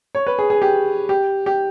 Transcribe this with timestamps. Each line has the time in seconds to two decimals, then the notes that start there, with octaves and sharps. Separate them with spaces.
0.15 C#5
0.27 B4
0.39 G#4
0.50 G#4
0.62 G4
1.09 G4
1.46 G4